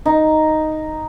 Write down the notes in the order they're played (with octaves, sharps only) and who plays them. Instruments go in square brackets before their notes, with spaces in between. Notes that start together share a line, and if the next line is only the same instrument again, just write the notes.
[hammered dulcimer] D#4